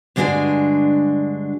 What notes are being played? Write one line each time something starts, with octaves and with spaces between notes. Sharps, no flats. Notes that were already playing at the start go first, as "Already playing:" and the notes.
G2 D3 G#3 D4 F#4 G#5